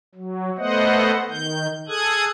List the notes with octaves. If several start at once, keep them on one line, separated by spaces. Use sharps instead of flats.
F#3
A3 B3 C5 D#5 F#5
D#3 G6
G#4 A4 D#6 F#6 G#6